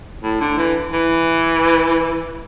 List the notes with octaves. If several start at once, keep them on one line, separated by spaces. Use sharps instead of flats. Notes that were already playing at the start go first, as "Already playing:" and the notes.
A2
D3
E3
E3